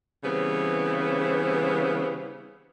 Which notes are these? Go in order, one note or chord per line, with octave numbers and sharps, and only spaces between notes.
C#3 E3 G3 B3 C4